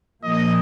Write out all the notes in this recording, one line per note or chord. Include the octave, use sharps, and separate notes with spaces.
A#2 F3 A#3 D#5